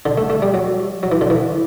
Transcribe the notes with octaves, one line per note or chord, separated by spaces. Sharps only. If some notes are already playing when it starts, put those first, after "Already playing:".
D3
A3
A3
G3
F#3
F#3
E3
D3
E3